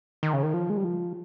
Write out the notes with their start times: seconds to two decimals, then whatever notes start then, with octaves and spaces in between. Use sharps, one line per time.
0.23 D#3
0.33 C#3
0.43 D#3
0.54 F3
0.70 G#3
0.77 G3
0.84 F3